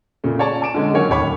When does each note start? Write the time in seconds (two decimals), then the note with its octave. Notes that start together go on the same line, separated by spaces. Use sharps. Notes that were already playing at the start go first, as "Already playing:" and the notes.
0.24 A#2 C#3 A3
0.39 C#5 D5 A5
0.61 G#5 A5 D6 D7 E7
0.74 D3 G#3 C#4
0.94 D#3 F#3 A#3 C#4 C#5
1.09 D1 D#2 C#5 B5 D6